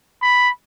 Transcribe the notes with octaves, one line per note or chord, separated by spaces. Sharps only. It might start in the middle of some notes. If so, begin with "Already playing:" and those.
B5